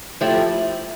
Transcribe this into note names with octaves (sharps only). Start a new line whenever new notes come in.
F3 A3 E4 G4